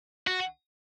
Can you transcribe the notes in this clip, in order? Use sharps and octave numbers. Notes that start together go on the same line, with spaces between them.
F#4